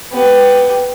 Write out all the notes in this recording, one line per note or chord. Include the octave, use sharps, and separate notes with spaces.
B3 G4